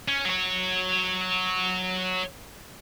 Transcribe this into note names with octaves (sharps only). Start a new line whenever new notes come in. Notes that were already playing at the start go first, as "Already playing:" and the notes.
C#4
F#3 C#5